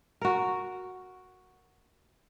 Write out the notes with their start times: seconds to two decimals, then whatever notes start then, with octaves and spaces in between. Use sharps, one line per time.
0.21 F#4 A#4